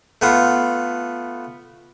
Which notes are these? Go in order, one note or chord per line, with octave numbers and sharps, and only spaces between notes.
A3 B3 F4